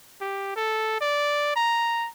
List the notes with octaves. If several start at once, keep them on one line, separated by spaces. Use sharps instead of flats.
G4
A4
D5
A#5